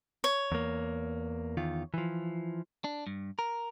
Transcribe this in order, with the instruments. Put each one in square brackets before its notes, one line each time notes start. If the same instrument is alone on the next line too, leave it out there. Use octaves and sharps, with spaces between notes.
[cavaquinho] C#5
[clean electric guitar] E2 A#3
E2 D#3 F4
E3 F3
D4
G2
A#4